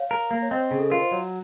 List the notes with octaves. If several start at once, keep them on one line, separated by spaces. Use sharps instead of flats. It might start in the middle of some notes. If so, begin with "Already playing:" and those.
Already playing: C#5 F5
A#4
A#3
C#5
C4 C5 D#5
C#3
A4
F4 A#4
C5
F#3 C#5